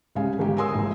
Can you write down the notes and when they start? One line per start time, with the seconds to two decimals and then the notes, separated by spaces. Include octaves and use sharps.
0.15 C2 C#3 G3 G#3 F5 G#5
0.39 G1 G#2 G4
0.57 A#4 C#5 G#5 C6 D#6 E6
0.74 F1 A#1 G#2 E3